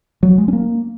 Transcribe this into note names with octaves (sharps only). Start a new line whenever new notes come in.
F#3
G#3
C#4
A#3